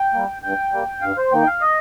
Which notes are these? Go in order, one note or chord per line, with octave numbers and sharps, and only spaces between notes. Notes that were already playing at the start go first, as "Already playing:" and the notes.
Already playing: G5
G3 A#3
G2 G5
G3 A#3
G2 F5
C5
D#3 A#3 D#4 G5
F5
D#5